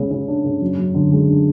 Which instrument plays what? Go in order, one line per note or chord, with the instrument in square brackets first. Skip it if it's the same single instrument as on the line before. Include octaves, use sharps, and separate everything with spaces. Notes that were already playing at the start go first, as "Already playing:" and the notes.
Already playing: [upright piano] C#3 G#3
C#3
D4
C#3
F#2
F#2
D3
G#3
D4